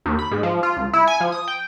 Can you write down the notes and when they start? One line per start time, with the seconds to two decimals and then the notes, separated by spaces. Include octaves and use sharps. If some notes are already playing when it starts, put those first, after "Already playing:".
0.06 D#2
0.19 B5
0.31 G#2
0.43 F3
0.63 F4
0.77 C#2
0.93 E4
1.07 G#5
1.20 F3
1.32 D#6
1.48 G5